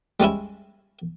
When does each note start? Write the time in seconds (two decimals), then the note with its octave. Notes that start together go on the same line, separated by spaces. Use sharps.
0.20 G3 G#3 C#4 E4